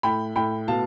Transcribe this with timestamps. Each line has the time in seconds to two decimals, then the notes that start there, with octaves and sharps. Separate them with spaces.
0.03 A2 G5 B5
0.36 A2 G5 B5
0.68 B2 F5 A5